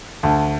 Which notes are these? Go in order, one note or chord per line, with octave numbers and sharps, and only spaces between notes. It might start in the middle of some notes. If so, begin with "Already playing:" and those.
D2 A5